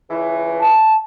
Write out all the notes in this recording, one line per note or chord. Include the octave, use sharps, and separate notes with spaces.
C#2 E3
A5